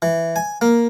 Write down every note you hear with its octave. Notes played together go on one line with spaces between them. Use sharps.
E3
G#5
A#3